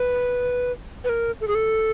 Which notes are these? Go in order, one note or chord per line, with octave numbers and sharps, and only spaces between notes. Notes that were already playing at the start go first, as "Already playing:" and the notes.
Already playing: B4
B4
A#4
A4
G#4
A4